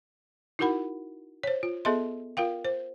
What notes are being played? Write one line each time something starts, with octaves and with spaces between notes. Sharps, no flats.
D#4 E4 F#4 A#4 F#5 B5
C5 C#5
F4
B3 G#4 A4 D#5 E5 C6
F4 A#4 F5 G5
C5